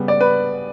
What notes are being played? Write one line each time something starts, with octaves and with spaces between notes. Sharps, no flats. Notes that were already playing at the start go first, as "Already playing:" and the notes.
Already playing: C#3 G3 B3
D5
B4